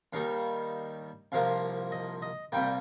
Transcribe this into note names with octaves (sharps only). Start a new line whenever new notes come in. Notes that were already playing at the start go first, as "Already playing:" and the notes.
D#2 D#3 G3 D#4 F5
C2 C3 F3 A#3 F5
D#5
D#5
C2 A#2 G3 A#3 G5